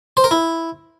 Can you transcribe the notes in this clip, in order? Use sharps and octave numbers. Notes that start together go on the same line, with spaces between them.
C5
A#4
E4